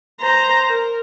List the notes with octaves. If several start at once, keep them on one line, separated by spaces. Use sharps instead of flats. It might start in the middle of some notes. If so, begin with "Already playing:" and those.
C5 A#5
A#4